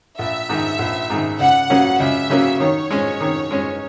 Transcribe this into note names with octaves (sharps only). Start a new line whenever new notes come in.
A#1 E5
G#2 D#3
A#1
G#2 D#3
C#2 F#5
C#3 F#3 A#3 C#4
C#2 E5
C#3 F#3 A#3 C#4
D#3 C#5
G#3 C#4
D#3
G#3 C#4